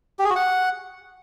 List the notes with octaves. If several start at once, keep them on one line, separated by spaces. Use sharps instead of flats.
G4
G#4
F#4
F#5